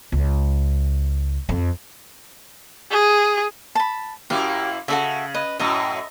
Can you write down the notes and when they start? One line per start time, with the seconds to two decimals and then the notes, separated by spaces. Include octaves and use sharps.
0.12 C#2
1.49 F2
2.91 G#4
3.75 A5 B5
4.30 F#2 A#3 E4 G4 F5
4.88 C#3 F#4 A4 E5
5.34 B4 D#5
5.59 F#2 A2 D#5 E5 A#5